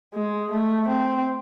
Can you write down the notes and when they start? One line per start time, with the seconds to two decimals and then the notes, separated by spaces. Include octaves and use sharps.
0.14 G#3
0.51 A3
0.88 C4